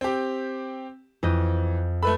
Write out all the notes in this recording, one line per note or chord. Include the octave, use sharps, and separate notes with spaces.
C4 G4
F2 E3 D#5 G6
A3 A4 B4 B5